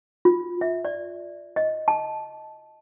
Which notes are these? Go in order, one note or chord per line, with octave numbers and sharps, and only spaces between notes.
F4
E5
D5
D#5
A5